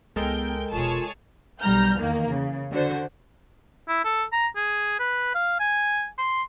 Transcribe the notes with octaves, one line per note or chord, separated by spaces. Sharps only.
C#2 G#3 B3 E4 A4 A#4 G5
E1 B2 F4 G#4 C#5 A5
B1 G3 A#5 F6 G6
E2 D#3 A#3
C#3
D3 F#4 C5
E4
A4
A#5
G#4
B4
F5
G#5
C6